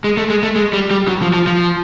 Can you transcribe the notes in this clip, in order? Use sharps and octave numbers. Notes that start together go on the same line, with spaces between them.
G#3
A3
G#3
A3
G#3
G3
G3
F#3
F3
F3
F3